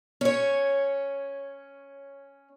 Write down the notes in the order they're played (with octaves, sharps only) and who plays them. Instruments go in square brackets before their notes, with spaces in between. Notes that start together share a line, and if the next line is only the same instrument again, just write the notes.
[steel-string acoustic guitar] C#4 C#5